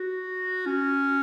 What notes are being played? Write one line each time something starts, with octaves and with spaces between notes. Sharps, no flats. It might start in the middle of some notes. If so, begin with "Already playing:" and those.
Already playing: F#4
C#4